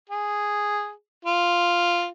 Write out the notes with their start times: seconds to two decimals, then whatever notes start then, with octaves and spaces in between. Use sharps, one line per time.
0.10 G#4
1.25 F4